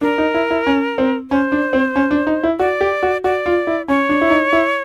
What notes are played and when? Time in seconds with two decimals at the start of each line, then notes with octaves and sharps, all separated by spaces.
0.01 D4 A#4
0.18 D#4
0.34 E4
0.51 E4
0.67 C#4
0.98 C4
1.30 C#4 C5
1.52 D4
1.73 C4
1.96 C#4
2.11 D4
2.27 D#4
2.43 E4
2.59 F#4 D5
2.81 G4
3.03 F#4
3.24 F#4 D5
3.46 F4
3.67 E4
3.88 C#4 C#5
4.09 D4
4.21 E4
4.30 D#4
4.53 E4